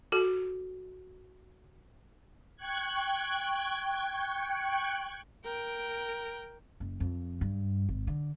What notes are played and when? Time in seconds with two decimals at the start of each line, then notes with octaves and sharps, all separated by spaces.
0.12 F#4 A4
2.56 G5 C#6 F#6 G#6
5.44 A#4 G5
6.80 F#1
7.00 F2
7.41 G2
7.89 G#1
8.07 D3